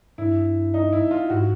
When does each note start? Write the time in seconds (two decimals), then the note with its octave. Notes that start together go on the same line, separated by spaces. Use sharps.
0.18 G2 E4
0.74 D#4
0.93 E4
1.11 F4
1.30 G#2 F#4